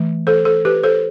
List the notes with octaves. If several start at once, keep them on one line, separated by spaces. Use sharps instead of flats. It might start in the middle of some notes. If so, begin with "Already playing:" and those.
Already playing: E3 A3
A4 C5
A4 C5
G4 B4
A4 C5